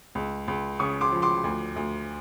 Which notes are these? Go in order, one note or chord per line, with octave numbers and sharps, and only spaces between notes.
C#2
C#2
C#3 C#6 D#6
C6 D6
F3
C6 D6
D2
D2